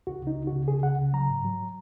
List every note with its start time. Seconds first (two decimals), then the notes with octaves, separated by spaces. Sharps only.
0.07 C#2 F#4
0.22 C#3 D#4
0.37 C#2
0.47 C#3 F#4
0.68 C#3 G#4
0.83 C#2 F#5
0.98 C#3
1.13 F#3 A#5
1.29 G#2
1.44 F#3